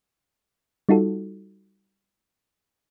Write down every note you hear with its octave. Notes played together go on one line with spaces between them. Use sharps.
G3 D#4 F4 F#4 A4